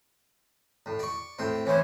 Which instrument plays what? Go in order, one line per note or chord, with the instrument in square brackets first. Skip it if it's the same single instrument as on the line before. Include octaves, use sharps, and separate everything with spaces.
[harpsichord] A2
D5 C#6
A2 C4
[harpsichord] E3 C5 [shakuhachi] C#5